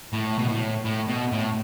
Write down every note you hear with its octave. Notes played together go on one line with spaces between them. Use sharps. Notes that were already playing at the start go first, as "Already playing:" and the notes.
A2
B2
A2
A2
B2
A2